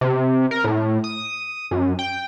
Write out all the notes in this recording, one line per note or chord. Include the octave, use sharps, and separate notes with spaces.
C3
A#4
A2
D#6
F#2
G5